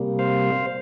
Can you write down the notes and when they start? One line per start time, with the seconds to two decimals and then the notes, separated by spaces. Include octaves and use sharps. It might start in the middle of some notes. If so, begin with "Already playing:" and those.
Already playing: C3 G3 A#3
0.19 C5 F5